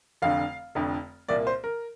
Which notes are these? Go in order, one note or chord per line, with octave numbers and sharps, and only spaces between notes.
F1 F2 D3 F5
F1 F2 D3
C2 A#2 A#3 D5
C5
A#4